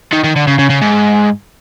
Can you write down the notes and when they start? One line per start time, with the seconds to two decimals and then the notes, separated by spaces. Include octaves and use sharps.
0.13 D#3
0.24 D#3
0.36 D3
0.48 C#3
0.59 C#3
0.70 C#3
0.82 G#2